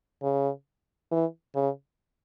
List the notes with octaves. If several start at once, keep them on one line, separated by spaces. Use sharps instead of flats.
C#3
E3
C#3